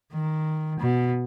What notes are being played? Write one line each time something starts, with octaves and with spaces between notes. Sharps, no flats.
D#3
B2